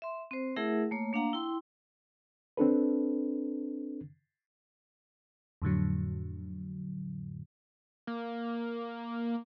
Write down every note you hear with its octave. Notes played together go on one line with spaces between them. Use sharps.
E5 C6
C4 C5
A3 E4 G#4 A#4 E5 F#5
A3 A#3 C#5
A#3 D4 F5 F#5 A#5
E4 G5 C6
C4 D4 A4 B4
F2 A2 D3 F#3
A#3